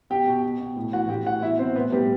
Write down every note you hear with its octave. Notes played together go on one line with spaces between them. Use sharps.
B2 G4 G5
B2
B2
B2
A2
E3 F#4 F#5
A2 G4 G5
E3 F#4 F#5
B2 E4 E5
B2 C4 C5
A2 B3 B4
A2 G3 G4